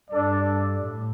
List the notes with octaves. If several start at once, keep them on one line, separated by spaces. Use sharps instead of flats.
G2 D4 A4 D5
A2